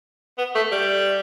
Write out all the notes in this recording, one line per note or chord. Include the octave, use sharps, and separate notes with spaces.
B3
A3
G3